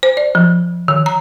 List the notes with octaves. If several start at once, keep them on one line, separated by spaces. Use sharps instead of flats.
C5
D5
F3
D#3
A#5